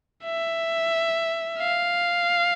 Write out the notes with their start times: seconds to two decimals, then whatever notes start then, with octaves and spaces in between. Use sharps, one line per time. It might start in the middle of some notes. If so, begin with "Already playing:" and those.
0.24 E5
1.59 F5